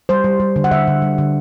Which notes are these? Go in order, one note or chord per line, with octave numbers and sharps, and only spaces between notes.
G3 C5
G3
G3
D3
F#5
D3 E5
D3
G3
D3